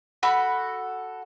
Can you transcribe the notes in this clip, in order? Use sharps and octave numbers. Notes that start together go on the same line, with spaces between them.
F#4 A4 B5